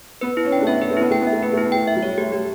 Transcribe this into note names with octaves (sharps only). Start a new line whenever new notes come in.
B3 B4
E4
C#4
D4 G5
A3
B3 E5
B4
A3
B3 E4
A3 G5
B3
E5
A3
B3 B4
A3 E4
B3
A3 G5
E5
F#3
G3 C#5
A3 G4
A3 G4